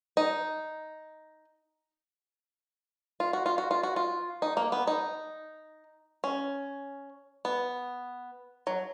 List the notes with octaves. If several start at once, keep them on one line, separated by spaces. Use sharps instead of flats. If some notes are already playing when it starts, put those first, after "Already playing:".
D#4
F4
F#4
F4
F#4
F4
F#4
F4
D#4
A#3
B3
D#4
C#4
B3
F#3